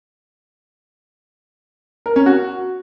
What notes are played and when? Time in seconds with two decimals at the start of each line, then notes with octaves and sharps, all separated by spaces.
2.06 A#4
2.16 C#4
2.26 F#4